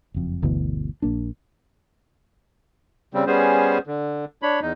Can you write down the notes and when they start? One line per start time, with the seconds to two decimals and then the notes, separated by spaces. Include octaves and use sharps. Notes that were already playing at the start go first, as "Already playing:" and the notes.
0.14 F#1 F2
0.42 G1 D2 B2 E3
1.02 A#1 A#3 D4
3.14 C#3 G3 C4
3.27 G3 B3 C#4 G#4 C5
3.87 D3
4.42 D4 C#5 B5
4.62 E2 D#4